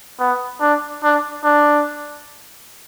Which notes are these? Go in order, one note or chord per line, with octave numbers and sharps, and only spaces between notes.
B3
D4
D4
D4